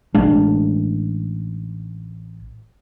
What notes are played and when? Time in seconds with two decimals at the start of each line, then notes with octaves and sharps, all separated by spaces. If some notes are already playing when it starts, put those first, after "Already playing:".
0.15 A1 G#3 D4